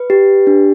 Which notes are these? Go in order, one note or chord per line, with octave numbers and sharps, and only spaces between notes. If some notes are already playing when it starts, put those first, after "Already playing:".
Already playing: B4
G4
D4